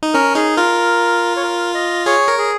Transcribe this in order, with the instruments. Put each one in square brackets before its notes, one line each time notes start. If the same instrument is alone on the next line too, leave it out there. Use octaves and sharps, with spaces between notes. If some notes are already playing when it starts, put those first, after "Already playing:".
[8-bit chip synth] D#4
[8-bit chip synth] C#4 [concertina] A#4
[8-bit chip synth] D#4 [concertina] G#4
[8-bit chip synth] F4 [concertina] A#4
[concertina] C#5
A#4
D#5
[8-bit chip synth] G#4 [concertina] C#5
[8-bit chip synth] A#4
[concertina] G#4